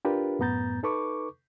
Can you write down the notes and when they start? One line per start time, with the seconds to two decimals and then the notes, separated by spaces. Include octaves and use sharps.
0.05 D4 F4 G4 A#4 B4
0.39 F#2 A2 B3 A#5 G6 A6
0.83 D#4 A4 B4 C#6 D6